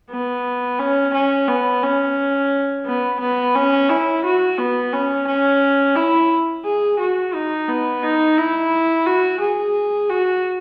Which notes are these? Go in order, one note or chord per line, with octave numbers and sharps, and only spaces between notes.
B3
C#4
C#4
B3
C#4
B3
B3
C#4
E4
F#4
B3
C#4
C#4
E4
G#4
F#4
D#4
B3
D#4
E4
F#4
G#4
F#4